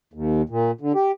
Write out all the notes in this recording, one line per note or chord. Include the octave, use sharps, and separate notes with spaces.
D#2
A#2
D3
G4